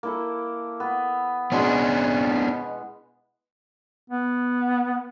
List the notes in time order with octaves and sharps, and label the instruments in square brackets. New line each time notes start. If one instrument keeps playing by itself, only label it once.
[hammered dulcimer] A#3 E4 A4
B3
[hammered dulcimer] B2 G#3 [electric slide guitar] B3 C#4 D4
[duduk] B3